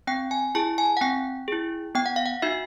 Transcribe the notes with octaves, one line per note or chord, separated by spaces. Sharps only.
C4 G5
G#5
E4 G#4 A5
G#5
F#5
C4 G5
E4 G#4
B3 G5
F#5
F5
F#5
D#4 F#4 E5